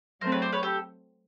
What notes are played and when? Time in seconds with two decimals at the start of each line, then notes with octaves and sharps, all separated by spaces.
0.21 F#3 A3 C4 A#4 C5
0.32 B4 C#5
0.42 C5 D5
0.52 B4 C#5
0.63 G4 A4